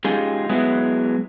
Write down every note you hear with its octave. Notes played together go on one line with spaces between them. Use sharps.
G#3 C#4 D#4 F4 G4 G#4
F#3 G#3 B3 E4